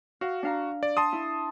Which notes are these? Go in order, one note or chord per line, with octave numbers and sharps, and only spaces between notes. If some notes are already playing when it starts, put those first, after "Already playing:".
F#4 F5
D4 F5 A#5
D5
A5 C6 D#6
E4